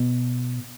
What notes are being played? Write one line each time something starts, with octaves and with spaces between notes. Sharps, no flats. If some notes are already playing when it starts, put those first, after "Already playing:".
Already playing: B2